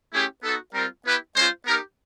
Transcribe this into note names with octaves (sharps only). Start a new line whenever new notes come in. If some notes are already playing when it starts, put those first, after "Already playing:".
A3 C#4 E4 G4 G#4
B3 D#4 F#4 A4
G3 C4 F4 A#4
B3 E4 G4 B4
G#3 C#4 F4 C5
B3 D#4 G4 A#4